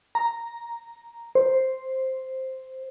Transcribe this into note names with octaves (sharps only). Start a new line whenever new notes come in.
A#5
C5